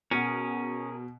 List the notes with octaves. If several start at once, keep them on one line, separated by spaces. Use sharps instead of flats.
B2 C#4 G#4 A#4 F#5